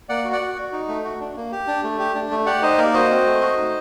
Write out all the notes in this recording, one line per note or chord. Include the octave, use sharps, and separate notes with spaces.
A#3 D5 F#5
F#4
D5 F#5
F#4
F#4
D#4
A3
F#4
D4
A#3
G4
D4
A3
G4
D4
A3
G4 D5 F#5
D#4 C5 D#5
A#3 A#4 D5
F#4 C5 D#5
C4
A3
F#4
D#4